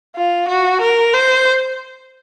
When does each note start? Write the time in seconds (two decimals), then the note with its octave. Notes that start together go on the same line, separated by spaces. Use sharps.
0.16 F4
0.48 F#4
0.81 A#4
1.13 C5